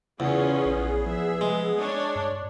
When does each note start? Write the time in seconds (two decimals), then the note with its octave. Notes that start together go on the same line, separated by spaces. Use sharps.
0.20 E2 C#3 B3 C#4 F4 G#4
0.66 A#1
1.06 F3 E5
1.41 G#3
1.79 D4 C#5
2.16 G2